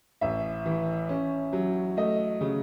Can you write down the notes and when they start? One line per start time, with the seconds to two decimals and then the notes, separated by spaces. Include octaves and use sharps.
0.21 A1 E5
0.65 E3
1.09 C#4
1.53 F#3
1.97 A3 D#5
2.41 C#3